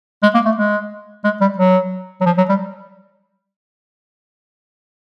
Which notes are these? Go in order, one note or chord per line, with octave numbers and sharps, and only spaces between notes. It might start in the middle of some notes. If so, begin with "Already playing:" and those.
G#3
A#3
A3
G#3
G#3
G3
F#3
F#3
F3
F#3
G3